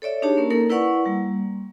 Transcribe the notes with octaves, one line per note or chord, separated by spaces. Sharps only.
A4 C#5 D5 E5
D4 D#4 G4 G#4 C#5 A5
A#3 C#4 A#4
A#3 D#4 A4 A#4
E4 B4 D5 F#5 C#6
G3 A#3